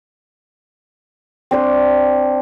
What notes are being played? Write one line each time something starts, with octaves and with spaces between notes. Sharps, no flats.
C4 D4 C5